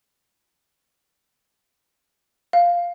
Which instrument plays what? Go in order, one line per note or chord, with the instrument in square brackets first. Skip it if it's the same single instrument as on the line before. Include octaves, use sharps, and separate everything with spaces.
[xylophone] F5